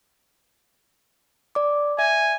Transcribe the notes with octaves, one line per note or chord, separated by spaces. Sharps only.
D5 D6
E5 G#5